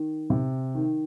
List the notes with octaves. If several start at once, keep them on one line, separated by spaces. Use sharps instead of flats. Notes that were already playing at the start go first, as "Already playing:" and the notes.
Already playing: D#3
C3
D#3